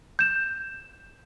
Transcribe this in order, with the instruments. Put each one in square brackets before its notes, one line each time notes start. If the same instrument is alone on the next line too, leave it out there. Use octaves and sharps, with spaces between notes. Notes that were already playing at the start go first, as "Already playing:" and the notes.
[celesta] G6 E7